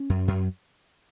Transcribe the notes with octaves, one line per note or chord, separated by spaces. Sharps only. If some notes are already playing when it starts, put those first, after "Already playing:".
Already playing: C#4
F#2
F#2